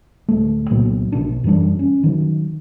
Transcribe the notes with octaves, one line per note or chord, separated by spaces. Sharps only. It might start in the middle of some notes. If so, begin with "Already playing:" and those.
D1 A3
C2 A#2 F#3 B3
A#1 B2 D4
F#2 E3 G3 D4
C#4
D#3 F#3